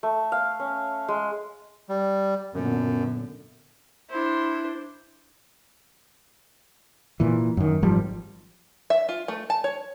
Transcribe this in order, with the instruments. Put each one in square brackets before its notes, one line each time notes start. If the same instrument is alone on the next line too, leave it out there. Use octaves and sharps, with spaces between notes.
[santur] A3
F5
C#4
G#3
[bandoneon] G3
[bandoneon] F#2 [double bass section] A#2 D3 B3
[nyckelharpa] D4 C5 [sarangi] E4
[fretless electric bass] A#2 E3
F#2 D#3
G#1 F3 G3
[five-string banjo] E5
F4
A3
A5
C#5